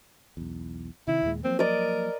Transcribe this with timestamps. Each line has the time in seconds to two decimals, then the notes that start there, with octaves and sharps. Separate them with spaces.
0.37 B1 E2
1.07 C3 D#3 E4
1.23 D#2 A#2 G#3
1.44 F3 F#3 A#3 C4
1.59 A#4 D5 D#5